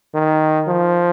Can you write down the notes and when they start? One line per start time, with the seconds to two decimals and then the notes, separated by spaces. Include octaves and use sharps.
0.14 D#3
0.68 F3